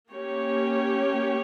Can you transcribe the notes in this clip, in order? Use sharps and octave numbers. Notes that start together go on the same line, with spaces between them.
A#3 C#4 G4 C#5